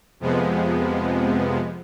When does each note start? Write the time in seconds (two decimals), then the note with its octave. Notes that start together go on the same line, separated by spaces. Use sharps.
0.20 F2 C3 F3 G#3 B3